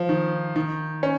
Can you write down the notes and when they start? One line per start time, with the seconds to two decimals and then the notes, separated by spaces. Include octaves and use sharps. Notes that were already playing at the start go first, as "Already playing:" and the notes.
Already playing: F3
0.09 D#3
0.56 D#3
1.03 C#4